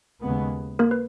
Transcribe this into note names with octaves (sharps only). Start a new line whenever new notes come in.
D#2 C#3 G#3 B3
A#3 A#4
B4